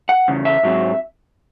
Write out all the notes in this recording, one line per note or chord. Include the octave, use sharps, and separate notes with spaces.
F#5
E2 C#3
E5
G#2 F#3 C4